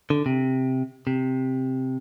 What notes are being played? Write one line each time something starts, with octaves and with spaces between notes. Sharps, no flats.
D3
C3
C3